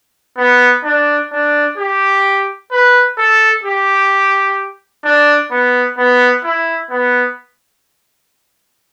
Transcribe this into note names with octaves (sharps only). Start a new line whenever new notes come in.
B3
D4
D4
G4
B4
A4
G4
D4
B3
B3
E4
B3